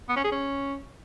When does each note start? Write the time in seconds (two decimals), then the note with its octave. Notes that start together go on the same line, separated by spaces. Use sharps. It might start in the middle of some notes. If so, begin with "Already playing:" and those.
0.09 B3
0.16 C#4
0.24 G#4
0.32 C#4